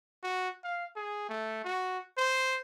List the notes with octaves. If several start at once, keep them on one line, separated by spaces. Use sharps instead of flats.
F#4
F5
G#4
A3
F#4
C5